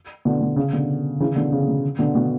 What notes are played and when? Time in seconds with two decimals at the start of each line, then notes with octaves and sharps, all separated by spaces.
0.25 B2 D3
0.41 B2
0.56 C#3
0.73 B2 D3
1.20 C#3 E3
1.36 B2 D3
1.52 C#3
1.68 B2
1.99 B2 D3
2.15 B2 D3